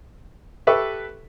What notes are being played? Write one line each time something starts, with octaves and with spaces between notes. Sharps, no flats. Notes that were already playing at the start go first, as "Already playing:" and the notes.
G4 A4 B4 E5 C#6